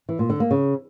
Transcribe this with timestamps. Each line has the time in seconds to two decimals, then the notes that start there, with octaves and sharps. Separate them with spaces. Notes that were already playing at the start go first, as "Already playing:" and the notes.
0.09 E3
0.19 A#2
0.30 D3
0.40 A#3
0.51 C#3